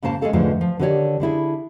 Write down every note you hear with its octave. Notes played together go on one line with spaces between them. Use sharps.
G#2 C#3 A#3 C5 A5
G#3 C4 C#4 G#4 A4 F5
E2 G#2 D3 F3 G#3 A3
F3
D3 D#3 G4 B4 C#5 D5
D3 D4 E4 G#4